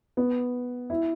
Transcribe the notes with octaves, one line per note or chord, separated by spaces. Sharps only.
B3
E4